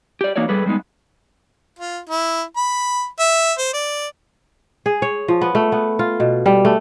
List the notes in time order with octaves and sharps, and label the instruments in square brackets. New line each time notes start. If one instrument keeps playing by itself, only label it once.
[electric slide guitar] G4 D5
E3 A#3 D#4 F#4 C#5 D5
G3 G#4 A4 B4
G3 G#3 B3 D#4
[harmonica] F4
E4
B5
E5
C5
D5
[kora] G#4
C#5
F3
B3
A3
B3
F4
B2
G3
A3